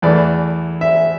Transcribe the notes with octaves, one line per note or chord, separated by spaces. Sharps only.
E2 E3 A3 D5
E5